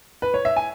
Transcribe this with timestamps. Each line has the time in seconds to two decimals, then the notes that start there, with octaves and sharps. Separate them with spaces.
0.22 B4
0.34 C#5
0.45 E5
0.56 G#5